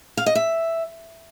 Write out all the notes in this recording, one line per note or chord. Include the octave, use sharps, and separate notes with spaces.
F5
D#5
E5